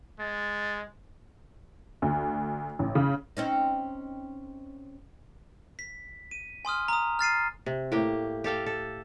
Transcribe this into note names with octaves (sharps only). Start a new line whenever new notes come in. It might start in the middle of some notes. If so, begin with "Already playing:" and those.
G#3 A6
D2
A1
C#3
C4 C#4 D#4
B6
D#7
G#5 C6 D#6 F6
A#5 D#6
F6 A6 C7 D#7
C3
A2 A#3 G4 G5
G4 A4 F5 G5
A4